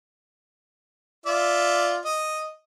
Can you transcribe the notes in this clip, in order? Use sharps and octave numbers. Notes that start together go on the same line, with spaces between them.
F4 D5 E5
D#5